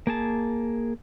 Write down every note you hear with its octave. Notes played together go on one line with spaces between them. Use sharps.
A#3 G#4 A5